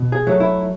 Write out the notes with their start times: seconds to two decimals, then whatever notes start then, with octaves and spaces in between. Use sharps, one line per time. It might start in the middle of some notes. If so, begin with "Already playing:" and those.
Already playing: B2
0.12 G#4
0.27 F#3 A3
0.40 E4